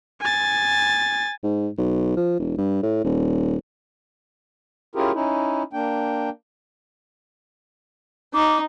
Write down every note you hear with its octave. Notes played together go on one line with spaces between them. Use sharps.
G#5 A6
G#2
B1
F3
E1
G2
A2
D#1
C#4 E4 F4 G4 G#4 A#4
C#4 D#4 E4
A#3 D4 G5
D#4 D6